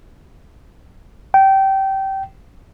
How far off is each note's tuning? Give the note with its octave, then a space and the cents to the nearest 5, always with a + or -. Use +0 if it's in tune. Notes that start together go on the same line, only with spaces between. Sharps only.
G5 -20